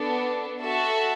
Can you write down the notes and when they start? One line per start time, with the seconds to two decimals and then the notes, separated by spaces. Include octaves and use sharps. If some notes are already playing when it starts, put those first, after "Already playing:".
Already playing: B3 D4 A4
0.62 F#4 A4 E5 A5